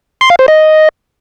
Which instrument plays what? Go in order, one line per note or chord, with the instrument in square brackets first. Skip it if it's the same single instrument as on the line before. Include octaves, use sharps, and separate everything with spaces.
[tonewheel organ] C6
F5
C5
D#5